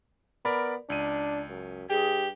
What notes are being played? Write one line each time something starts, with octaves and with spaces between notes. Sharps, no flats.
B3 A#4 D5 B5
C#2 D4 D#7
F#2
G2 G4 G#4